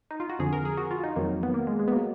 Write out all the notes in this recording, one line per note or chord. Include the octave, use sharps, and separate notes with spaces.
D#4
F4
F#4
F2 D3 F3 G#4
A#4
G#4
F#4
F4
D#4
F2 D#3 F#3 A#3
B3
A#3
G#3
G#3
B3
F#3 A#3